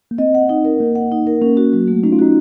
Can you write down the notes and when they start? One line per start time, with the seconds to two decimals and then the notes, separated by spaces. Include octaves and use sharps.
0.11 A#3
0.18 C4 D#5
0.35 F#5
0.49 D#4
0.65 A#4
0.80 A#3 D#5
0.95 F#5
1.12 D#4
1.27 A#4
1.42 A#3 C#4
1.57 F#4
1.73 F#3
1.88 A3
2.03 C#4 D#4
2.12 F4
2.19 D#4 F#4